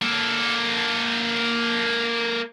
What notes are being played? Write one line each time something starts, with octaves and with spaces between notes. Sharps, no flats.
A#3 A4